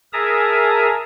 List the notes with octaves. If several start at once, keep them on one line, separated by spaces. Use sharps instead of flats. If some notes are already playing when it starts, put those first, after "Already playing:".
G#4 A#4 E5 A5 A#5 D#6